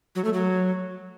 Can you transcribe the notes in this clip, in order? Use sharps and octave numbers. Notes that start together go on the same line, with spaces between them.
F#3
A3
F#3